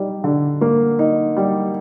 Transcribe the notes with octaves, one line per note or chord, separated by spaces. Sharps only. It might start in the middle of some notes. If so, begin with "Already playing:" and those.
Already playing: G3 D#4
D3
A#3
D#4
G3